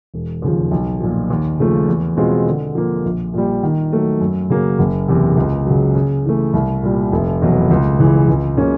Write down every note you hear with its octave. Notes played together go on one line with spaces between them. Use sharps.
E1
D#2 C#3 F3
B1
A#2 F3
D#2
C#3 F3 A3
E2
B2 G#3 C4 F4
D3
F3 A#3
A#1
A#2 G3
D#3
F#3 A3
F#2
C#3 F#3 A#3
F#1
E2 C3
C#2
C#3 F#3
C#3
E3 A3
C2
A#2 G3
F1
E2 B2 F#3
C#2
C#3 E3
C#2
C#3 F#3 A#3 C#4